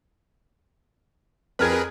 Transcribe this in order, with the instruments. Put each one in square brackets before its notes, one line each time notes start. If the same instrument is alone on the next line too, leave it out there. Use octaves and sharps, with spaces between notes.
[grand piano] F2 F6 G#6 [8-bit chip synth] G#4 A#4 B4